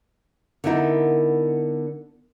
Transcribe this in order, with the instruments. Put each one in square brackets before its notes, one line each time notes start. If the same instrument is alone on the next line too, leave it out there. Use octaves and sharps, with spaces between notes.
[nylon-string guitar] D3 B3 D#4 E4 A#4